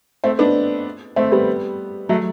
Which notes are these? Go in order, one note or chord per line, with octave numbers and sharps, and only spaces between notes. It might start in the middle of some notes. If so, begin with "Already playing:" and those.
A3 C4
B3 D4
A3 C4
G3 B3
F#3 A3